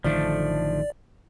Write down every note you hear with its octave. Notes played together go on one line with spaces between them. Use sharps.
A1 D3 D#3 F3 A3 D4 D5